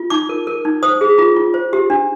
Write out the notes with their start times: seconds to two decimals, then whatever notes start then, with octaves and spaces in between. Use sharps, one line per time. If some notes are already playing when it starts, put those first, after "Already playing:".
Already playing: F4
0.10 D#4 D6
0.29 A#4
0.47 A#4
0.65 D#4
0.83 C5 D#6
1.01 G#4
1.18 F4
1.36 F4
1.54 C5
1.73 G4
1.90 D4